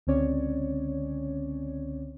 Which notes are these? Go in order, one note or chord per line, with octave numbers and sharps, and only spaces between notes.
C#2 D3 C4 C#4 C#5 D5